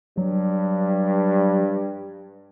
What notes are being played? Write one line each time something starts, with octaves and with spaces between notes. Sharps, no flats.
G2 F#3